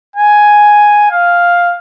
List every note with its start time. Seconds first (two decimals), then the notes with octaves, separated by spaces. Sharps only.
0.16 G#5
1.11 F5